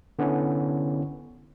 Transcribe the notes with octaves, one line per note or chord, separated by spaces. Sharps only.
D3 B3 C#4 E4 C#5